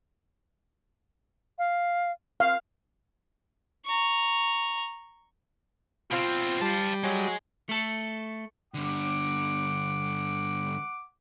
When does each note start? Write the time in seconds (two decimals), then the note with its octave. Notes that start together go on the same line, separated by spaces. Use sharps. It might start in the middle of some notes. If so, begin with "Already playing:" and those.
1.59 F5
2.40 C4 F5
3.86 A#5 C#6
6.11 B2 C4 F4
6.62 G3 F5 A5
7.04 F#3 G#3
7.69 A3 A4
8.74 G2 D3 F#5 D6